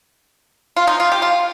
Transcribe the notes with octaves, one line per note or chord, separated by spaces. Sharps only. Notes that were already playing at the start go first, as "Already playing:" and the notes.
F4
D#4
F4
G4
F4